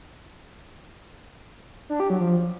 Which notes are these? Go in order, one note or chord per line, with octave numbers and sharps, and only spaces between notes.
D4
G4
F#3
F3